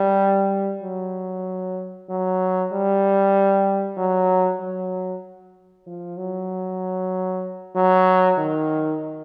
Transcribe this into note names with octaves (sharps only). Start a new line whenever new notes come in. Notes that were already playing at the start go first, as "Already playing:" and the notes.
Already playing: G3
F#3
F#3
G3
F#3
F#3
F3
F#3
F#3
D#3